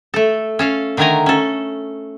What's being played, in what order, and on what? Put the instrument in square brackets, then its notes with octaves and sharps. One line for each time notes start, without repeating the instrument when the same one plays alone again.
[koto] A3 A4
C#4 A4 F5
D3 D#3 A3 A#4 G#5 A#5
C#4 A4